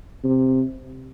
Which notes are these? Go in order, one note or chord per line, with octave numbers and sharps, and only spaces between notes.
C3